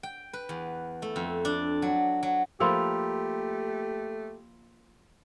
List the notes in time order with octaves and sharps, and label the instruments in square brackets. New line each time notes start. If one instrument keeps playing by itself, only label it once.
[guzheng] G5
B4
E2
A3
F2
D4
F#3
F#3
[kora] F3 A#3 [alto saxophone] A3 [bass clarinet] G4 [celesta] B5 C6 E6